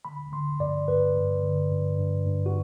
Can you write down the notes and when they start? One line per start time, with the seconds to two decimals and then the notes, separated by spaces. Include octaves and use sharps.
0.05 D3 B5
0.33 D3 C6
0.60 G2 D5
0.88 G2 B4
1.16 G2
1.43 D3
1.71 G2
1.98 G2
2.26 G2
2.46 F#4